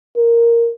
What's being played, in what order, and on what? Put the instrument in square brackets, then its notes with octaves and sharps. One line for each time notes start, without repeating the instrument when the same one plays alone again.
[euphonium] A#4